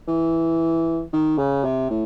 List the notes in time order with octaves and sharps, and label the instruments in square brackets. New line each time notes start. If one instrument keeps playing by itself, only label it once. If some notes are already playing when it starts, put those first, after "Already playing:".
[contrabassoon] E3
D#3
C#3
C3
A2